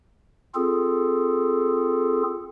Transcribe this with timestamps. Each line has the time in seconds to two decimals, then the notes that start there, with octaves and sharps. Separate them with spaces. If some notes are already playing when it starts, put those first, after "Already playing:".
0.55 C4 F4 G#4 A4